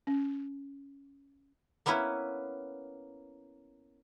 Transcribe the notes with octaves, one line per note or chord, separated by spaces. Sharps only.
C#4
A#3 B3 C#4 E4 B4